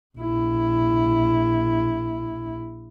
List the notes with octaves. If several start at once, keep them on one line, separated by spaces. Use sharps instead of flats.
A#1 E4